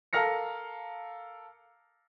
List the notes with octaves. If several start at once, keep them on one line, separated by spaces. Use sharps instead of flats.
A4 A#4 F5 F6 A#6 C#7